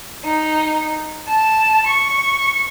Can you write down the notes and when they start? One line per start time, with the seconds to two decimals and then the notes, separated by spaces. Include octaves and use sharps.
0.25 D#4
1.26 A5
1.85 C#6